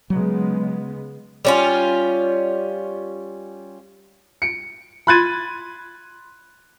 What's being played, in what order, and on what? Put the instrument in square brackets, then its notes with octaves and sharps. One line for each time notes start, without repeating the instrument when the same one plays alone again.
[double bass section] C#3 G#3 B3 [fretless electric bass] F#3
[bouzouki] G3 C#4 F4
[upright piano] C#7 D7
B5 C6 F#6 G#6 A6 D#7